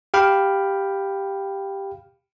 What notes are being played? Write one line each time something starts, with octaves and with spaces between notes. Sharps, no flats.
G4 F5 G5 B5 F6